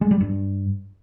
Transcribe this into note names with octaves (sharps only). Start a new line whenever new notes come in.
G#3
G3
G2